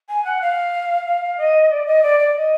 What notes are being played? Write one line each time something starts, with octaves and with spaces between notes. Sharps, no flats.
G#5
F#5
F5
F5
D#5
D5
D#5
D5
D5
D#5